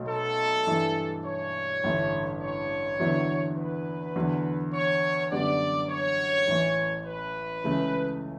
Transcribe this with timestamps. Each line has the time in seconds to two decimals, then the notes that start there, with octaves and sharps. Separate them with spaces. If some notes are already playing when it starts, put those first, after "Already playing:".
Already playing: B1 B2 A3
0.09 A4
0.66 G2 E3 A3 E4
1.25 C#5
1.84 A1 G2 D3 A3 E4
2.41 C#5
3.00 E2 D3 F#3 B3 E4
3.58 B4
4.16 E2 D3 F#3
4.74 C#5
5.32 F#2 D3 G3 B3 F#4 D5
5.90 C#5
6.48 A1 A2 E3
7.06 B4
7.64 C#2 C#3 E3 A3